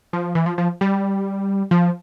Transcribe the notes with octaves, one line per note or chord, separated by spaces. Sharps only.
F3
E3
F3
F3
G3
F3